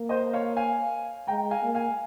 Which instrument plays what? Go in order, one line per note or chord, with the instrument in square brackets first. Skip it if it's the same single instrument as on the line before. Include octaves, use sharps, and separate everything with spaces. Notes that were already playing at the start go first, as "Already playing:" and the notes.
Already playing: [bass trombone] A#3
[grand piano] C5 D#5
C#5 F5
F5 G#5
[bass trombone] G#3 [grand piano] G5 A#5
[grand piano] F5 G#5
[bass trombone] A#3
[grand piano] F5 G#5